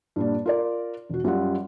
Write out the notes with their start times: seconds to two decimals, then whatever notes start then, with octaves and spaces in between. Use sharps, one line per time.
0.16 G2 A#2 D4
0.46 F4 A#4 D5
1.10 E1 F#4
1.24 F#2 G3 F4 F#5